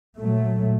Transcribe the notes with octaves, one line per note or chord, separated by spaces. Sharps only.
A#2 F#3 A3